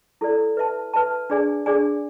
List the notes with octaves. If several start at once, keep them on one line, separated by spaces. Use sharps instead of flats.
E4 A4 D5
B4 E5 A5
B4 E5 A5
D4 G#4 D5 G#5
D4 G#4 D5 G#5